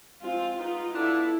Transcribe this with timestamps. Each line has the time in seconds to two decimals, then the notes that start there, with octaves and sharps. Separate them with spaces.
0.21 F3 G#3 C4 F4
0.57 G#3 B3 D#4 F4
0.94 B3 D4 E4 F4 A4